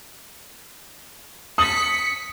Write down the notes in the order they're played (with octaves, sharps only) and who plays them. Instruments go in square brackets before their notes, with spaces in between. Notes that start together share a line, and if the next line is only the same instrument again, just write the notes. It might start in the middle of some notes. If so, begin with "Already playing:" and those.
[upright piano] D#6 F#7 [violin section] B6 C#7